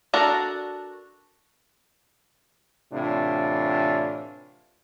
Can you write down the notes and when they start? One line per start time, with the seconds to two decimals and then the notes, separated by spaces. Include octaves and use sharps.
0.14 D4 F#4 A4 A#4
2.93 A2 C3 E3 D4 F4